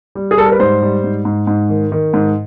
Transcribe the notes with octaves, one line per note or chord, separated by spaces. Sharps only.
G3
G#4
G3 A4
A#4
B4
G#2 C5
G3
G#2
G#2
G#2
D#3
D#3
G#2